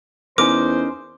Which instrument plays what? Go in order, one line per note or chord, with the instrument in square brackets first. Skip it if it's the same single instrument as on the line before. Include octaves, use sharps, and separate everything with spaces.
[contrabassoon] E2 [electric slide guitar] C#4 D#4 A#4 [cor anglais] C5 [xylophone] D6